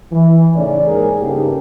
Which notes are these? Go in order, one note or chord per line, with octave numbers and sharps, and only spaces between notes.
E3
A2 C#3 C#4 D#4 D5
D#2 G#2 G#4 A#4
G2 C#3 A#3 D#4 G4 A4